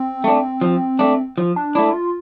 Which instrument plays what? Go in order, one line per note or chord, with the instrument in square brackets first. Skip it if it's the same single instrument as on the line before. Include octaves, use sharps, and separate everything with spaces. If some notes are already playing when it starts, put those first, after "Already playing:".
Already playing: [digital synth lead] C4
[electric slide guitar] A3 D4
F3
A3 D4
F3
[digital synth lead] D4
[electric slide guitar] A3 D4 [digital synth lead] E4
[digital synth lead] F4